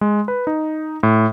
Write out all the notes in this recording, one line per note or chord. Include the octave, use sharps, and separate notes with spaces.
G#3
B4
D#4
A2